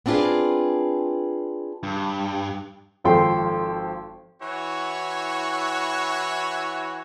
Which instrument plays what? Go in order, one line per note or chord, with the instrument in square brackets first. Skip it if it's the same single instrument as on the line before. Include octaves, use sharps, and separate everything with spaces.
[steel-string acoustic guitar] B3 C4 D4 F4 G#4 B4
[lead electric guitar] G2
[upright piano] G#1 F3 A4 G5 C6
[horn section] E3 E4 F#4 C#5